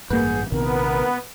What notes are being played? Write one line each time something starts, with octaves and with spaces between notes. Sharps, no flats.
A1 G2 A#3 G#4 B4 F#5 G6
A#1 C3 D#3 B3 A#4